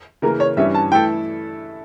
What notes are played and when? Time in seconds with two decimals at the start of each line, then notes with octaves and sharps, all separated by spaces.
0.22 C#3 E3 A#3 A#4
0.40 C#5
0.57 G2 E3 G3 C#4 E5
0.75 A5
0.92 E3 A3 E4 A4 G5